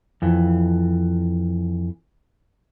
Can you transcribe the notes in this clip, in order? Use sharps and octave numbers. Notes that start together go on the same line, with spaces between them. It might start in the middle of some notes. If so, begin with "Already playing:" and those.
F2 E3